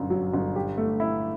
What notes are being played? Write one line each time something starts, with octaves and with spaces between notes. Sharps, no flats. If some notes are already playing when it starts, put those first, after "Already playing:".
Already playing: G1 F#2
F#3
G1
G4
A3
E4